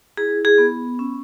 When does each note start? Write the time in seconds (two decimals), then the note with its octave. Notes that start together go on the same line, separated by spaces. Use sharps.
0.17 E4 G#4
0.45 G#4
0.58 B3
0.99 C#4